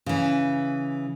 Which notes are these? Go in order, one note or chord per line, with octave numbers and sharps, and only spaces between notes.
C#3 E3